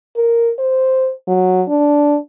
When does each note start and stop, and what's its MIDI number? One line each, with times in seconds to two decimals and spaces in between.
0.16 0.52 70
0.59 1.11 72
1.28 1.63 54
1.68 2.18 62